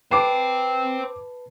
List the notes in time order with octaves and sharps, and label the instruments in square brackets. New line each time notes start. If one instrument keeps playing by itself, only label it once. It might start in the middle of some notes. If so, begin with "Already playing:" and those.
[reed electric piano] B4 A5 [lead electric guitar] C5 G5 [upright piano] D6 C7 E7